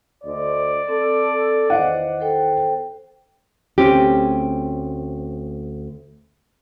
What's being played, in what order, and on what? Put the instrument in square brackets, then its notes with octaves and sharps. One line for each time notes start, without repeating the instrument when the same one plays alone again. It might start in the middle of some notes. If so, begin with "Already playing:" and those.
[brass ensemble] D2 C5 D#5 [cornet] D5
[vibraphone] C4 [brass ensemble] A4
[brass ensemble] E2 D#3 [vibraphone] C5 D#5 [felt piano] F#5
[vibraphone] A4 C5 G5
[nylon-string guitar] D2 C4 C#4 G4